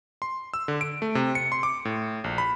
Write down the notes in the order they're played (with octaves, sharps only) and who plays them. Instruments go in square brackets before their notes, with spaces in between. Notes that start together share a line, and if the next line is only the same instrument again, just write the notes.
[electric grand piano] C6
E6
D3
D7
A3
C3
C#7
C6
D6
A2
A#1
B5